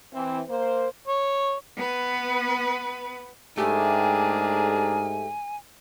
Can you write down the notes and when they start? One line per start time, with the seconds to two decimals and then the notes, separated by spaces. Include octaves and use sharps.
0.14 E3 C4
0.49 A#3 C5
1.08 C#5
1.76 B3 B4
3.57 G#2 A3 D4 G4 G#4 A#4 G#5